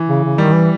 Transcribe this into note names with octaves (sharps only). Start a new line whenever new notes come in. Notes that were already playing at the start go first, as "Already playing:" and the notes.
Already playing: E3
C#3
C#3
D#3 G3
E3